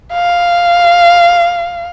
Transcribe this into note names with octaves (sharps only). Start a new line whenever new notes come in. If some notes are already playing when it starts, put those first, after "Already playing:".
F5